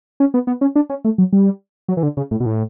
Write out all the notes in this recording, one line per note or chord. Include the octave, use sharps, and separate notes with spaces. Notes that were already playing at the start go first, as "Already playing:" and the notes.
C#4
B3
B3
C#4
D4
C#4
A3
F#3
G3
F#3
E3
D3
C#3
A2
B2
A2